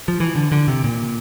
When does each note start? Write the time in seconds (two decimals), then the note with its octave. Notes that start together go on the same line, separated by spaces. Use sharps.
0.08 F3
0.20 E3
0.35 D3
0.52 D3
0.68 C3
0.84 A#2